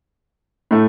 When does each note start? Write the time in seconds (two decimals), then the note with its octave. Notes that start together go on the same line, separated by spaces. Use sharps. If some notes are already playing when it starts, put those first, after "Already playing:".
0.71 A2 A3